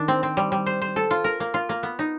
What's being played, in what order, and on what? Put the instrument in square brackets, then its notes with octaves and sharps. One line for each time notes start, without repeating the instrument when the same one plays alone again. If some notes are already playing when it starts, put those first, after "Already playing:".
Already playing: [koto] D#3 D4
C4
C4
G3
G3
C5
C5
A4
F4
A#4
A#3
F4
A#3
B3
D#4